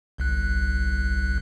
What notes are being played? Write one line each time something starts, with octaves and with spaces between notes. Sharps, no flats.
G1 C2 F#6